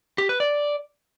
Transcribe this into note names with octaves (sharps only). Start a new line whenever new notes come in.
G4
B4
D5